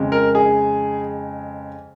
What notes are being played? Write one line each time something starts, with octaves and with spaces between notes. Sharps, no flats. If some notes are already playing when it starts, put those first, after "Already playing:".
Already playing: F2 C#3 G#3
A#4
G#4